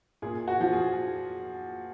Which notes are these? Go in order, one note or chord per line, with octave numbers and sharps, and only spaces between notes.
A#2 G#4
F#4
F3
G#4